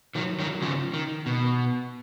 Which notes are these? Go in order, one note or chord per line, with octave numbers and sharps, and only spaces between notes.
D#3 F#3
D#3 F#3
C#3 F3
D#3
B2